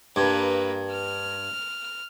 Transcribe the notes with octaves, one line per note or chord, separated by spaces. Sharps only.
G2 A#3 B4
F6